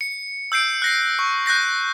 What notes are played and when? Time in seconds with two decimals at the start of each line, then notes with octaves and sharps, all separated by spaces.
0.01 C#7
0.52 E6 G6 C7 D7
0.82 F#6 A#6 C7
1.19 C#6
1.46 F#6 G6 A#6 C7